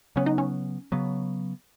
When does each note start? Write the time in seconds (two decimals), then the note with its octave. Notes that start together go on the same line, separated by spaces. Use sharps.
0.16 C#3 F#3 B3 C#4
0.26 D#4
0.38 C#4
0.92 C#3 F#3 B3